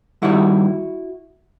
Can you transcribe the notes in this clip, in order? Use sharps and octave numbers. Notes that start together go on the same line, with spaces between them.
G2 D#3 G3 E4 F#4